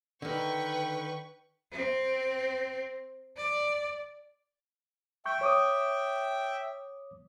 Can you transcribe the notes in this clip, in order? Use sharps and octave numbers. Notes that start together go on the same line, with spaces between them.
D3 D#3 B4 G5 C#6
C4
D5
E5 G5 C#6 G6
C#5 D6 D#6